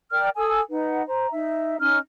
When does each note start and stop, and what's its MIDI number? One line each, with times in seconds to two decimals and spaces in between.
0.12 0.29 70
0.12 0.29 74
0.12 0.29 79
0.12 0.29 89
0.37 0.60 69
0.37 0.60 80
0.37 0.60 87
0.37 0.60 88
0.71 1.02 63
0.71 1.02 71
0.71 1.02 78
1.06 1.30 72
1.06 1.30 82
1.31 1.77 63
1.31 1.77 76
1.80 1.98 61
1.80 1.98 63
1.80 1.98 89